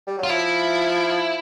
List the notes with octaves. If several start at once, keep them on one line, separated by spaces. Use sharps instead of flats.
G3
F#3 F4
F3 E4